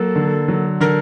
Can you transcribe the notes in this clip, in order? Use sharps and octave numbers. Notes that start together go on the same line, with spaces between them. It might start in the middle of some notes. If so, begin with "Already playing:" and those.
Already playing: F#3 A#3 A4
D3
F#3
D3 A#4